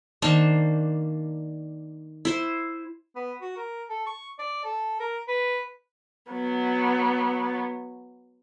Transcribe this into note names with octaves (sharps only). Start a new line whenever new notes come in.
D#3 A#3 D4 C5
E4 C5
B3
F#4
A#4
A4
C#6
D5
A4
A#4
B4
F#3 B3